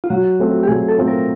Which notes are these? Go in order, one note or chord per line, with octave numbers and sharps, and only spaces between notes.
F4
F#3 F#4
A3 C4 F4
G4
F#3 G#4
A4
A3 C4 F4
A#4